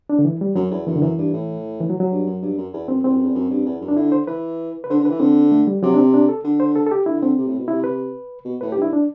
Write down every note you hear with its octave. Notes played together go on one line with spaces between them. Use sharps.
D4
D3
E3
G3
F#2 F#3
E2
F#2 E3
D3
F#2 E3
G2
A2
E3
F#3
F#3
G2
F#2
G2
F#2
E2
F#2 C4
E2 C4
F#2
E2
F#2
G2
E2
F#2
D4
D3 E4
C5
E3 B4
B4
D3 C5
D3
E3 B4
D3 C4
A3
G3
C3 F#3
D4
C4
D4
A4
D3
C5
A4
A4
G4
D3 E4
D3 C4
C3
A2
B2
C3 E4
B4
B2
A2 B4
G4
G2
E4
D4